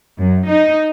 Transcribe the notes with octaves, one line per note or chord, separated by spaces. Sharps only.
F#2
D#4